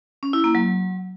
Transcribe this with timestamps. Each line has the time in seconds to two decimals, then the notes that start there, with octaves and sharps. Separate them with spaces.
0.23 C#4
0.33 E4
0.44 A#3
0.55 F#3